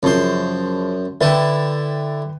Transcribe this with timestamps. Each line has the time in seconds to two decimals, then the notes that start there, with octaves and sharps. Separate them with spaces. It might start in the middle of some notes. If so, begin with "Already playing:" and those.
0.03 F#2 C#3 F3 C5
1.21 D3 E4 B4 G5 A5